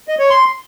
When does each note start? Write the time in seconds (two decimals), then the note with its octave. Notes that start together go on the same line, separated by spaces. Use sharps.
0.08 D#5
0.19 C#5
0.30 C6